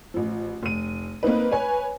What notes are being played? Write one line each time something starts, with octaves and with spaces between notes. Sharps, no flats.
A1 F3
F1 D#7
A#3 C4 D#4 B4
B4 C#5 G#5